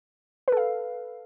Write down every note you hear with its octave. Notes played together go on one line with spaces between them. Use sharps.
A4 B4 F5